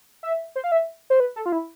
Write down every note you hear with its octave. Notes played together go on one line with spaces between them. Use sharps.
E5
C5
F5
E5
C5
B4
A4
F4
E4